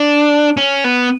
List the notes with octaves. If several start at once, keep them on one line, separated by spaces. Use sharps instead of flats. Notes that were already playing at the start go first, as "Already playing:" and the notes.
Already playing: D4
C#4
B3